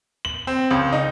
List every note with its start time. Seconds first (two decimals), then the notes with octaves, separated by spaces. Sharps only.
0.25 F#7
0.47 C4
0.71 C#2
0.92 D#4